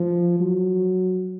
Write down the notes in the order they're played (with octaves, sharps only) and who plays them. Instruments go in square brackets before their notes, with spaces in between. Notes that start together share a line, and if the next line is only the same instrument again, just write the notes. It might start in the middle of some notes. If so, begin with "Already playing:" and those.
Already playing: [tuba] F3
F#3